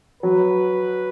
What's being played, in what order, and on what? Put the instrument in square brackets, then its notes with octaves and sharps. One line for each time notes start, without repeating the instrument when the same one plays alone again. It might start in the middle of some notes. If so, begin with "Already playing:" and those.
[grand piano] F#3 [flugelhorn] B4